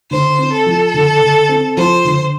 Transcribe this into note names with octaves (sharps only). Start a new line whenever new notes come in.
D3 C5
C4
A4
F3
D3
D3
C4
F3 C5
D3